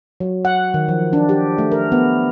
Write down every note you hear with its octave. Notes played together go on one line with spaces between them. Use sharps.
F#3
F#5
D#3
F3
D4
G4
A3
A#4
B3